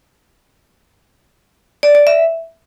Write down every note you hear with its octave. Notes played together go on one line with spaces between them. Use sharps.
D5
D5
E5